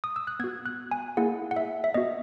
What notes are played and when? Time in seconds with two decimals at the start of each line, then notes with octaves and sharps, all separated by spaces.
0.04 D#6
0.16 E6
0.27 F#6
0.40 B3 F#4 G#6
0.66 F#6
0.91 G#5
1.17 A#3 E4 G#4 F#5
1.51 F#5
1.56 E5
1.84 E5
1.94 B3 F#4 D#5